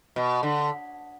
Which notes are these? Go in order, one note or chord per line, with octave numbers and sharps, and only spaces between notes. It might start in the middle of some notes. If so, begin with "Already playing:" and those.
B2
D3